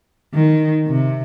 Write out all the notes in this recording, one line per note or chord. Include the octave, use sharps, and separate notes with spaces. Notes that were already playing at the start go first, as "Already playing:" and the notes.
D#3
C3